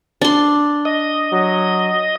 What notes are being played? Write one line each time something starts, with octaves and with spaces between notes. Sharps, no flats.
D4 C6
D#5
F#3